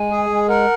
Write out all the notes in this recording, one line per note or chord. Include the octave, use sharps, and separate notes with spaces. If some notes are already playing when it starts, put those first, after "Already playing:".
Already playing: G#3 G#5
G#4
G#3
A#4 F#5